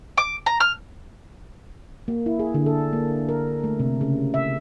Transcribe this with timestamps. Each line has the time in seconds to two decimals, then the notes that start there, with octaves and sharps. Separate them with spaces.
0.18 D6
0.46 A#5
0.60 F6
2.08 A#3
2.26 E4
2.39 G#4
2.54 D3
2.66 A4
2.93 A#3
3.29 A#4
3.64 A3
3.80 C3
4.01 C#3
4.34 E5